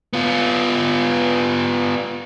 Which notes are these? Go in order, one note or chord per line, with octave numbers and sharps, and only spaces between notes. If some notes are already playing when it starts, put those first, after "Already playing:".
B3 F4